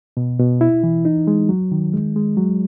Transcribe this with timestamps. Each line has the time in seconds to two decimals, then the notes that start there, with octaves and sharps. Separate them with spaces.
0.17 B2
0.39 B2
0.61 E4
0.83 E3
1.05 D#4
1.27 G#3
1.49 F#3
1.72 D#3
1.93 G#3
2.16 G#3
2.37 F#3